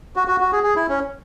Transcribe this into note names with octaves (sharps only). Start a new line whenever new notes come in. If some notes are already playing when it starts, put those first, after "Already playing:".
F#4
F#4
F#4
G#4
G#4
E4
C#4